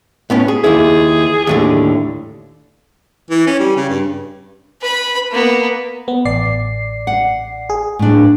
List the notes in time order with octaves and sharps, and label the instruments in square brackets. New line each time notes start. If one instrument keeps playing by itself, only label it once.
[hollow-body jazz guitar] A2 B3 C#4
G#4
[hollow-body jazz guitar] D#2 E4 [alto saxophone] G#4
[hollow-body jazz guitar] D#2 A2 D3
[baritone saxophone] E3
C#4
G3
C#3
G2
[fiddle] B4 B5
A#3 B3
[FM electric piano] B3
A1 D5 C7
[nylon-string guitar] F#5
[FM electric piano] G#4
[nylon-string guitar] A2 D4